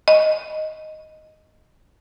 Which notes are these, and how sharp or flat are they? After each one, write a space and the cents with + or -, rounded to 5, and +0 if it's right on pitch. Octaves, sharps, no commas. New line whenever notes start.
D#5 +0